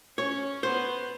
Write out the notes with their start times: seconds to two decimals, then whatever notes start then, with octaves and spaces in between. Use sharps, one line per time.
0.18 C#4 C#5
0.63 B3 C5